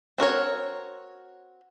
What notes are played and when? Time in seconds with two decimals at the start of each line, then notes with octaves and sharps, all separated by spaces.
0.18 C4 F#4 A#4 C#5